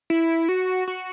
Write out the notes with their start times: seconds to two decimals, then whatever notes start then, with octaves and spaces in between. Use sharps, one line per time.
0.10 E4
0.49 F#4
0.88 F#4